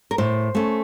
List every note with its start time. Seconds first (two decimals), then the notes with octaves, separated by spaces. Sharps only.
0.11 A#4
0.18 A2 C5
0.55 A3 C#4